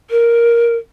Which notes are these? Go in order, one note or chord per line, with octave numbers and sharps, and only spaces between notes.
A#4